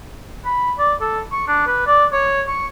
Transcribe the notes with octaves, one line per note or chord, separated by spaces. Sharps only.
B5
D5
A4
C#6
D4
B4
D5
C#5
C#6